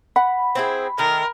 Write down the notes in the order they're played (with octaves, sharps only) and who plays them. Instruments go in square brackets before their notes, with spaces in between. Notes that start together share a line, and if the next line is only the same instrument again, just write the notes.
[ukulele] F#5 [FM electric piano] B5
[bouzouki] C4 E4 G#4
[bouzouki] D#3 A3 [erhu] A#4